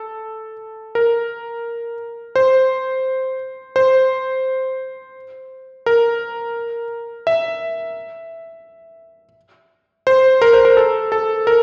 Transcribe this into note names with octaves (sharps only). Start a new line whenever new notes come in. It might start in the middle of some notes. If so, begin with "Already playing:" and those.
Already playing: A4
A#4
C5
C5
A#4
E5
C5
A#4
C5
A#4
A4
A4
A#4